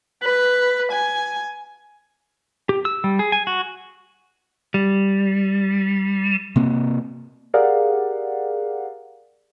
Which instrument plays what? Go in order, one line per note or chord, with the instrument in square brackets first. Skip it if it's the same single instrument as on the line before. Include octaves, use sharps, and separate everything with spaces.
[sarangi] B4
G#5
[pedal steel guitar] G4
E6
G3
G#4
G#5
F#4
[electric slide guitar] G3
[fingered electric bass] C3 A#3 C4
[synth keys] G4 G#4 A#4 D5 F5 F#5